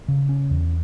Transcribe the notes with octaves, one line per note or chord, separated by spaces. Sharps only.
C#3
C#4
E2